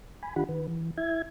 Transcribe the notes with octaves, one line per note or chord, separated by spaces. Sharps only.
G#5 B5
D#3 D4 F4 G4 F#5 B5
D#3 B4
E3
E4 E5 G#6